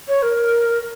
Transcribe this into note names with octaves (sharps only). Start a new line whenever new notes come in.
C#5
A#4